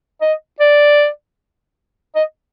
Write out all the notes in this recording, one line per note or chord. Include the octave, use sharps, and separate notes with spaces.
D#5
D5
D#5